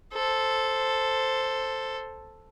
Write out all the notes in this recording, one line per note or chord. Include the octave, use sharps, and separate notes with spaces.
A4 C5